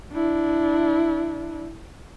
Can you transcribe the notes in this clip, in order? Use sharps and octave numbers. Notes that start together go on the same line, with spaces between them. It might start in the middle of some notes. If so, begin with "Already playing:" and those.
D4 E4